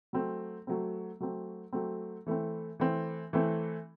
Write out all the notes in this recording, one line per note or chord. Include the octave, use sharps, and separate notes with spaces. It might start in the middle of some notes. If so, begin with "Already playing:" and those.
F#3 A3 C4
F#3 A3 C4
F#3 A3 C4
F#3 A3 C4
E3 A3 C4
E3 A3 C4
E3 A3 C4